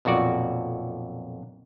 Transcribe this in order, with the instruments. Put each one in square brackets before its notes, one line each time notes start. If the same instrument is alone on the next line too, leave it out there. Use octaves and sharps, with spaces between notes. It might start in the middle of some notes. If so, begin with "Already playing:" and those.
[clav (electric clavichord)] B1 F2 A#2 F#4 D5